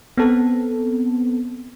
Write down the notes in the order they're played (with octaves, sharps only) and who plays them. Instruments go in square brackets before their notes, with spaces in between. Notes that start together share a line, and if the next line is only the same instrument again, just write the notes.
[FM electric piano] B3 C4 A4